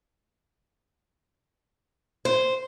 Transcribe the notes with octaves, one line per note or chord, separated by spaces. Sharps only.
C5